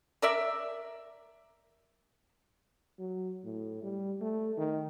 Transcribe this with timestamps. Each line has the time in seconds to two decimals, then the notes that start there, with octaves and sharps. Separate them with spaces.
0.22 A#4 D5 E5
2.99 F#3
3.44 A2
3.83 G3
4.21 A3
4.57 D#3